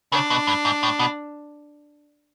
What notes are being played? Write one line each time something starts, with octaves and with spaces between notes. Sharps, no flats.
C#3 D4
B2
G2
G#2
A2
B2